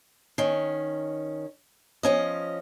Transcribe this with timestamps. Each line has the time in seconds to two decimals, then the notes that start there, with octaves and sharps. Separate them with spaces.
0.38 D#3 C#4
2.03 F3 C#4 D#5